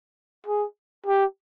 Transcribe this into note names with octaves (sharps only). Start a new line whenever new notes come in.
G#4
G4